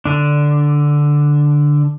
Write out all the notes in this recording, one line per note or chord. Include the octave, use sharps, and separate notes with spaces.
D3 D4